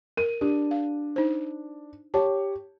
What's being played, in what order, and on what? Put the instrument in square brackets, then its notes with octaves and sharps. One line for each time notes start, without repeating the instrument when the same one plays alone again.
[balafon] A#4 [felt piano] D#7
[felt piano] D4 [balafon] G4
[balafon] F5
D#4 C5
[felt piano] G4 C#5 [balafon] A5